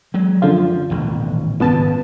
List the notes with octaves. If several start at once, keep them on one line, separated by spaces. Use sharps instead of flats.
F#3 G#3
F#2 D3 F3 F4
D#1 A1 B2
G#1 C#2 G2 C#3 B3 A5